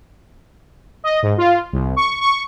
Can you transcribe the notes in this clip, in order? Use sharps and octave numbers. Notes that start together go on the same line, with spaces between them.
D#5
G#2
F4
C2
C#6
C#6